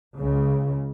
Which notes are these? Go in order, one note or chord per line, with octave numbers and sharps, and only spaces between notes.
C#2 C#3